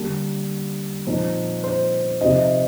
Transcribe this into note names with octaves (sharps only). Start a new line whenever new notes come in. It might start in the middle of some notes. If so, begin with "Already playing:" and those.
Already playing: D3 G3 A#3 D4
A#2 F3 C4 D#4
C5
C3 F3 C4 D#4 D#5